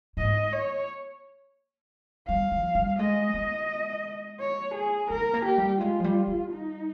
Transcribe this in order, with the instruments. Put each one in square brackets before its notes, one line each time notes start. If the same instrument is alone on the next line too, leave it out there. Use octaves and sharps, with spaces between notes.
[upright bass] G#2 [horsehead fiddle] D#5
[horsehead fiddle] C#5
[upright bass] G3 [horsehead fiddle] F5
[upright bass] F3
G3
[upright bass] G#3 [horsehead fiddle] D#5
[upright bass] G#3
[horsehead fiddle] C#5
G#4
[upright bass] G#3 [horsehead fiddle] A#4
[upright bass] A#3
[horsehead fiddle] G4
[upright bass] G3
[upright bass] G#3 [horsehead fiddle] F4
[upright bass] F3
G3
G3
[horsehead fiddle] D#4